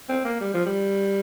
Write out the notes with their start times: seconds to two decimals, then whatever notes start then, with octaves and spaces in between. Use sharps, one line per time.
0.09 C4
0.24 A#3
0.40 G3
0.54 F3
0.66 G3